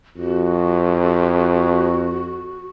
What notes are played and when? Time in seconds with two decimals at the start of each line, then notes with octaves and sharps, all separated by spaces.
0.17 F2 F#4